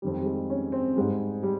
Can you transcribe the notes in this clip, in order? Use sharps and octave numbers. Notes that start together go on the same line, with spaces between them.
F2 D#3 G3
G3
G#3
C#4
C4
G#2 G3 G#3
G3